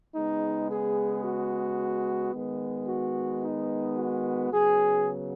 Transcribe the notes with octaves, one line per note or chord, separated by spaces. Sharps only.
C#3 G#3 B3 D#4
G#4
F#4
D#3 G#3 B3
F#4
D#4
F#4
C#3 F#3 B3 G#4